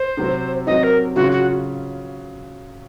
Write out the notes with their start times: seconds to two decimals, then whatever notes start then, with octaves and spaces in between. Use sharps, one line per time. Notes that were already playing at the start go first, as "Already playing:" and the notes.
Already playing: C5
0.17 C3 F#3 C4
0.67 C3 F#3 C4 D#5
0.83 A#4
1.16 C#3 F#3 C#4 F4 F#4
1.32 F#4